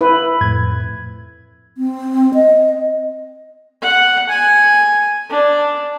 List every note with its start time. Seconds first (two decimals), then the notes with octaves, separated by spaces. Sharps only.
0.01 E4 B4
0.41 F2 A2 G#6
1.78 C4
2.34 D#5
3.82 F#5
4.29 G#5
5.30 D4